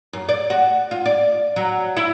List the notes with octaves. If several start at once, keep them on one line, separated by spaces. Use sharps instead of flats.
F#2
D5
F#4
F4
D5
F#3
E4